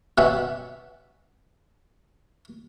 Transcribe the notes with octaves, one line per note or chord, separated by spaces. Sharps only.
B2 C#4 E5 F#5 G#5 B5